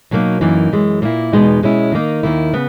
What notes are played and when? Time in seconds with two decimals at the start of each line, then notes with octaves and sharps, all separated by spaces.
0.11 B2 F#3 A#3 D#4
0.41 F#2 E3 A#3 D#4
0.72 F#2 E3 G#3
1.02 A#2 A#3 E4
1.33 E2 B2 G#3 B3 D#4
1.62 B2 G#3 C#4 E4
1.92 D#3 A#3 D#4
2.23 D#2 D#3 A#3 E4
2.53 C#3 B3